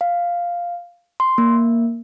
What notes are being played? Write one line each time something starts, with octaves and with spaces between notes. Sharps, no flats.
F5
C6
A#3